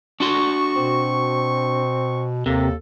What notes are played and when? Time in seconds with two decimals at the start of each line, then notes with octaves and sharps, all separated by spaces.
0.20 D4 F#4 C6 C#6
0.76 B2 C4
2.46 D#2 C3 A#3 A4